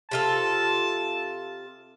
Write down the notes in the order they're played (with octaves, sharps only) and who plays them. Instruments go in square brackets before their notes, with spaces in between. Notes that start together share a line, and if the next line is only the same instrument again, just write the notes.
[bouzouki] C3 F4 A4 [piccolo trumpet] A5